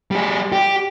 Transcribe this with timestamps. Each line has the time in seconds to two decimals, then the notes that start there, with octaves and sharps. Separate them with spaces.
0.11 G3 G#4
0.52 G4